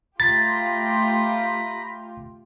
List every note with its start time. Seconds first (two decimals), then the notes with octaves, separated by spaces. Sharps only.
0.20 A3 F4 G4 A#5 B5 A6